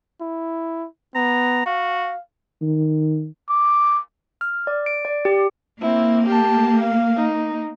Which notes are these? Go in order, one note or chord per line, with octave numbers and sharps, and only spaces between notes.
E4
B3 A#5
F#4 F5
D#3
D6
F6
D5
D7
D5
G4
A#3 C4 E4
G4 A5
F5
D#4